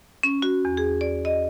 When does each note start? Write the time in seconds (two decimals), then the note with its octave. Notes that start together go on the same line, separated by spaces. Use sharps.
0.23 C#4
0.42 F#4
0.65 E2
0.77 G#4
1.01 D5
1.25 D#5